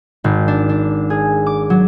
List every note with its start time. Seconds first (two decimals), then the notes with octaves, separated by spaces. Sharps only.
0.24 G#1
0.48 D4
0.69 D4
1.10 G#4
1.46 D6
1.70 F#3